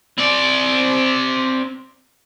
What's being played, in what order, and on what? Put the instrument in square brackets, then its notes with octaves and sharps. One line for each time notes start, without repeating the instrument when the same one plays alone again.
[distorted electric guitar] C4 D5